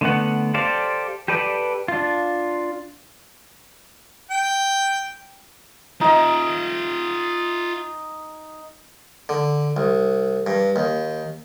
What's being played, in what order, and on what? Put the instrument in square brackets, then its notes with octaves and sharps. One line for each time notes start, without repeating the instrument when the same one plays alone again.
[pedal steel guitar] D3 A3 B3 F#5
G4 A4 C5 D5 F5
G4 A4 B4 D5
D4 F4
[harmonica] G5
[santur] D#4 D#5 [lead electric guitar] F4 E5
[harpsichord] D3
C2
G2
D#2